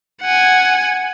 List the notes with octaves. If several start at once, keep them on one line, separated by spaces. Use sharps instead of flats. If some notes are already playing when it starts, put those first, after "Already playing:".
F#5 G#5